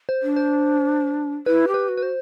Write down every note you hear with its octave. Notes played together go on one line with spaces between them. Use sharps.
C5
D4
C5
E4 B4
G4
B4
F#4
B4
C5